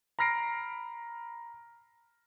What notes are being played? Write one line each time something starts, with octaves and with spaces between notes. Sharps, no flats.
A#5 B5 F6 A#6 C7 D7